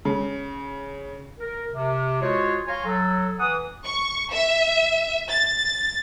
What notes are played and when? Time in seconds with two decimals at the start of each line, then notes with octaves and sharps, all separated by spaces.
0.05 C#3
1.39 A#4
1.72 C3
2.21 G#3 F4 F#4 G#4 C5 C#5
2.67 C#5 F5 G#5 A#5 C6
2.85 F#3 A4
3.38 E3 F#5 D#6
3.84 C#6
4.31 E5
5.29 A6